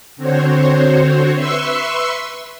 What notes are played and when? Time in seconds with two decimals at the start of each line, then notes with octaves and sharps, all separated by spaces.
0.16 D3 C4 F#4 C5 C#5
1.34 B4 E5 C6 C#6 E6